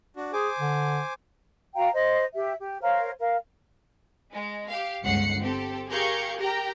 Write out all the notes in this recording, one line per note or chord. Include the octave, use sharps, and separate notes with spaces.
D4 F#4
G#4 C5 G#5 D6
D3
F#4 F5 G5 A#5
C5 D#5
G4 E5
G4
A#4 C5 C#5 F5
A#4 F5
G#3
G4 F5
G1 C#2 F#5 C7 C#7
C4 G4 A4
G4 G#4 A#4 F5 C#6 G6
G4 A#4 G5 A#5